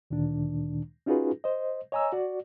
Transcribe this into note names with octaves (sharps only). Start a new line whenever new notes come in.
D2 A#2 D#3 D4
C#4 D#4 F4 F#4 G#4 B4
C5 D#5
C#5 D#5 G#5 A#5 E6
F#4 D5